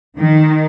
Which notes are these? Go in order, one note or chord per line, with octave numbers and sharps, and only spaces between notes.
D#3